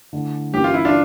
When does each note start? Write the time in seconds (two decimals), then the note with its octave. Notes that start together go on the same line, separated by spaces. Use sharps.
0.13 D3 A3 E4
0.53 G2 E3 A#3 C#4 G4
0.64 F4
0.74 E4
0.85 D4 F4